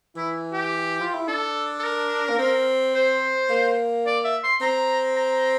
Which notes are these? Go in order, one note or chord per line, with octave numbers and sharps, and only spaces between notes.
E3 E4
G4
F4
E4
D4 A4
A4
A#4
A#3
C4
C5
A#3
D5
E5
C6
C4 A#5
A#5